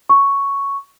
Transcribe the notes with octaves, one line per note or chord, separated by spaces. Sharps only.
C#6